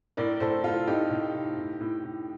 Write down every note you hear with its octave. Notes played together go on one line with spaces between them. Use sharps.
A2 A#4 D5
A2 A4 C5
A2 F4 A4
A2 D#4 G4
A2
A2
A2
A2
A2